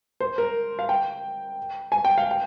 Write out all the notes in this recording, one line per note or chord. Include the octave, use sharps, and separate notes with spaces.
C5
A#4
F5
G5
G#5
G5
F5
G5